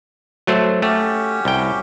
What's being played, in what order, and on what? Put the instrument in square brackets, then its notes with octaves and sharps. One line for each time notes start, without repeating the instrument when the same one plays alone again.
[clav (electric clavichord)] F#3 A3 C5
[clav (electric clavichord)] A3 [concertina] C#4 F#4 G4
[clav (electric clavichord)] C2 G5